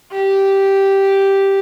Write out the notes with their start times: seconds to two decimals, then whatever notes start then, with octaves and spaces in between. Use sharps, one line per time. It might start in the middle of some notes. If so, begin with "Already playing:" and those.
0.12 G4